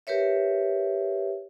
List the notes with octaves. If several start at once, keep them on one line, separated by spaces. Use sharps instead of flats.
G4 A#4 B4 C#5 E5